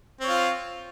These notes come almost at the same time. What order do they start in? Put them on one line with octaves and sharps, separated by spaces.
C4 C#5 F4